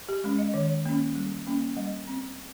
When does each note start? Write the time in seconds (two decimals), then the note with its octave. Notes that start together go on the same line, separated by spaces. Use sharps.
0.09 G4
0.24 G#3 C#4
0.38 D#5
0.54 D#3 C#5
0.86 A#3 C#4
1.15 G3
1.47 A#3 C#4
1.77 G3 D#5
2.07 C4